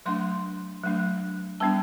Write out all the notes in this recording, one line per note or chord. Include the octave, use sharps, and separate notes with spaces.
F#3 A3 D4 C6
F#3 A3 D4
G3 B3 D4 A5